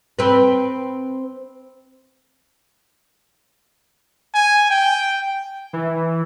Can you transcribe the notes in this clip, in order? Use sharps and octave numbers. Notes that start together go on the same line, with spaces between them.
C4 B4
G#5
G5
E3